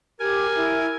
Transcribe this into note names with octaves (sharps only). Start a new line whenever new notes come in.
G4 A#4 G#5
E4